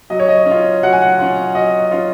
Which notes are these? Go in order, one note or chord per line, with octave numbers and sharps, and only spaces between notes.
F#3 D#5
C#5
D#5
C#4
F4
F#3 F#5
G#5
F#5
C#4 F4
F#3 D#5
C#4 F4